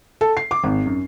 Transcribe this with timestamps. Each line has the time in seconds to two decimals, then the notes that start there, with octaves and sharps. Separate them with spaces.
0.21 A4
0.37 C7
0.51 D6
0.64 G#1
0.86 F#2